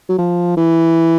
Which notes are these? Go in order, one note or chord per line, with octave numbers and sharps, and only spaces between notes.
F#3
F3
E3